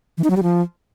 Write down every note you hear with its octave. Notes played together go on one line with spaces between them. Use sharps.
E3
D#4
F#3
G3
F3